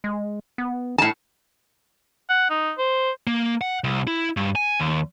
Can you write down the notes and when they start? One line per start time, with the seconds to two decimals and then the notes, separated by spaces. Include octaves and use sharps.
0.04 G#3
0.58 B3
0.98 A2 A5
2.29 F#5
2.50 D#4
2.78 C5
3.27 A#3
3.61 F#5
3.84 C2
4.07 E4
4.37 G2
4.55 G#5
4.80 D#2